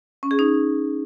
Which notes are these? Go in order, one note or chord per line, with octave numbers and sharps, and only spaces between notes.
C#4
G#4
D#4